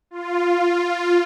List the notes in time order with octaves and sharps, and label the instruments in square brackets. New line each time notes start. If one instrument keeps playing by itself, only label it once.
[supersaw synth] F4